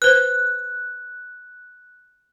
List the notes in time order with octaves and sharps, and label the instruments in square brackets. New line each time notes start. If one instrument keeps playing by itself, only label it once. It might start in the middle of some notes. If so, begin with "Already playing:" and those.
[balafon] B4 C5 [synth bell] F#6